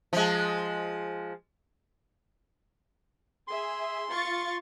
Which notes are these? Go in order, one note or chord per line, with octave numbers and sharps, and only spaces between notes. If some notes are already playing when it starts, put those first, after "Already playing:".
F3 G#3
G#4 E5 C6
F4 C#6 A6